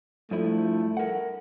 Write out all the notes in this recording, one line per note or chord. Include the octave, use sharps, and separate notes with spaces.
G2 F3 A3 E4
A#4 F#5